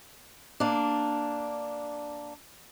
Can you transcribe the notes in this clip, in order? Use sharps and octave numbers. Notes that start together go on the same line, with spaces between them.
A#3 D4